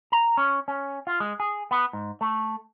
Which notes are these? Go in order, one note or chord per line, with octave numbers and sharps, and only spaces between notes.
A#5
C#4
C#4
F4
G#3
G#4
B3
G#2
A3